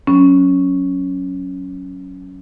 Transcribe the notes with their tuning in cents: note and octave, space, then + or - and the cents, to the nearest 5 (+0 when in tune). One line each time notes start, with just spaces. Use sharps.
F#3 +0 C#4 +0